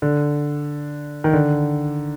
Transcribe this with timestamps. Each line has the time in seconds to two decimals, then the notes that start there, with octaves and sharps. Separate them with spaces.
0.02 D3
1.24 D#3
1.33 D3